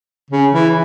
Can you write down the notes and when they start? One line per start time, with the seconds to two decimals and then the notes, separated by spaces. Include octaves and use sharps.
0.30 C#3
0.52 E3